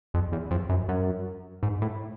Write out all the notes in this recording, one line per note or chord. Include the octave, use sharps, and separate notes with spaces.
F2
E2
F2
F#2
F#2
G#2
A2